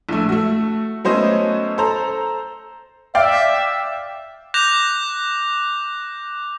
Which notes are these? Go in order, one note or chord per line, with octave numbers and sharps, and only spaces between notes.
A#1 A3
A3 F#4
F#3 A3 B3 C#4 C5 D#5
A4 C5 A#5
D5 E5 F5 G5
D6 F#6 G6 A#6 F7